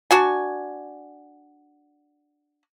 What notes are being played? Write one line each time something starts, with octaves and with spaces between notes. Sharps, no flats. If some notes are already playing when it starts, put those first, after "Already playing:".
D4 F#4 G#5